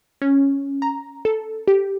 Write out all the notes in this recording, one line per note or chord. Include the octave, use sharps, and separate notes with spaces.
C#4
A#5
A4
G4